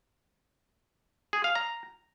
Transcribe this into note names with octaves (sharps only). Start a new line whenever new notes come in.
G#4
F5
A#5